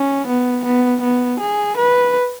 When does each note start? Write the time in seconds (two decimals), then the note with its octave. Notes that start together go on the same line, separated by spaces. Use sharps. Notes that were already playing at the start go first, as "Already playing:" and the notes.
Already playing: C#4
0.27 B3
0.65 B3
1.02 B3
1.40 G#4
1.77 B4